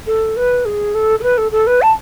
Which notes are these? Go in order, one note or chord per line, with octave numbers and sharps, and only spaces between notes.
A4
B4
G#4
A4
A4
B4
A4
A4
B4
A5